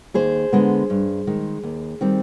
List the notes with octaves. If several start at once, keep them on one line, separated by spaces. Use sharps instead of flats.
D#2 G#4 C5
D3 G#3 B3
G2
D#3 G#3
D#2
D#3 G3 C4